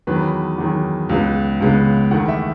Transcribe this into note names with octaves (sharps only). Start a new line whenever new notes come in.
E2 D#3 F#3 B4
E2 D#3 F#3
C#2 C#3 G#3 B3
C#2 C#3 G#3 B3
E2 D#3 A3 F#5
E5